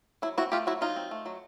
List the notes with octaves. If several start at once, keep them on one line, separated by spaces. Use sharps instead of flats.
F#3 E4
C4 E4 F#4
A3 F4 G4
F#3 E4 F#4
F#3 D#4 F4
C4
A3
F#3